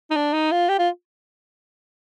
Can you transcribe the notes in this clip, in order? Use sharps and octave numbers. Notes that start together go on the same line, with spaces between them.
D#4
D4
D#4
F4
G4
F4